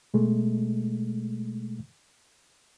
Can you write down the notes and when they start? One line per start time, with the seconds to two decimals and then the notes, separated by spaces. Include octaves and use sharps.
0.14 B2 G#3 A3